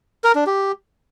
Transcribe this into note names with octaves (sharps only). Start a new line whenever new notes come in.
A#4
D4
G4